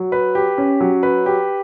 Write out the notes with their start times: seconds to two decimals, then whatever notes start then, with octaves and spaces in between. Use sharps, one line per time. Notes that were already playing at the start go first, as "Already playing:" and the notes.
Already playing: F#3
0.12 B4
0.35 G4
0.58 C#4
0.81 F#3
1.03 B4
1.26 G4